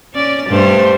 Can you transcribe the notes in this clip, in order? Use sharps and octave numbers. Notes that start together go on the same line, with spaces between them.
C#4 D5
G2 A3 C5